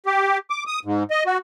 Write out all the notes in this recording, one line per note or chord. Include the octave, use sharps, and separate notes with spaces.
G4
D6
D#6
G#2
D#5
F#4